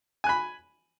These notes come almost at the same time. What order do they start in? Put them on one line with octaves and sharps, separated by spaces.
G#5 F#6 B5